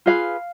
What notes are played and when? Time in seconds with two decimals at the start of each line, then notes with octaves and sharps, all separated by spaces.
0.06 F4 G#4 B4 F5